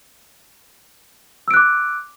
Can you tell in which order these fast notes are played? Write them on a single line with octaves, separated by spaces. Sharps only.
E6 D7 F#6 D6